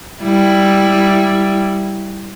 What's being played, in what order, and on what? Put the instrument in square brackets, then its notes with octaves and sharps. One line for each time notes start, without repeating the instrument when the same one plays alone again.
[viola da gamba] G3 E4